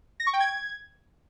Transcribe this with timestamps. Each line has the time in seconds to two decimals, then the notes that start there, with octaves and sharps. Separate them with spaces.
0.20 A#6
0.27 C#6
0.33 G5
0.40 G#6